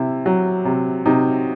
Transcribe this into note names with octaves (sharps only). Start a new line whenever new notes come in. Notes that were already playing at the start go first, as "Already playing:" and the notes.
Already playing: C3 E4
F#3
C3
C3 D#4